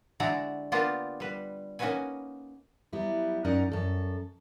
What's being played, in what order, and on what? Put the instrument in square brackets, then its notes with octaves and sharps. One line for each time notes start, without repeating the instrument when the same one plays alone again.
[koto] D3 G#3 E4 F#4 D5 A#5
A#3 B3 D4 F4 G4 A#4
G3 B4
A#3 C#4 D#4 F#4 B4 G#5
[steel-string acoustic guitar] F#3 G3 B3 E4
F#2 C#4 D#4 A#4 D5 F#5
F#2 A4